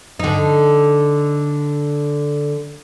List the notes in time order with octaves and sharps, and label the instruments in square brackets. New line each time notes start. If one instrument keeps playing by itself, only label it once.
[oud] D3 D#4